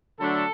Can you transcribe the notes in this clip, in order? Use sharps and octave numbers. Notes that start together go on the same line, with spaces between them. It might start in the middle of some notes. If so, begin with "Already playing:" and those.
D3 F#3 A3 D4 A4